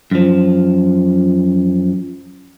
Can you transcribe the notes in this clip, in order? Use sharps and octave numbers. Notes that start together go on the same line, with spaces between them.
F#2 F3